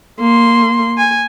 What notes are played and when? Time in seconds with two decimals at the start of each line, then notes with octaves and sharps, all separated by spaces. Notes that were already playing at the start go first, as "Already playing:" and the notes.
0.19 A#3 C6
0.98 G#5